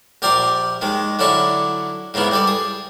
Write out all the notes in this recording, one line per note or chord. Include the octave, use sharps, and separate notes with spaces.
A#1 G4 A#4 D5 C6 D6
D#2 D#3 G#3
D3 F#3 C#4 E4 D5 C#6
G#2 C#3 A#3 B3 E4
G3 A4 D5
G#4